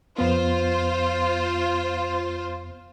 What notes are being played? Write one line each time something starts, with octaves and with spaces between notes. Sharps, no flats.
F2 B3 F4 C5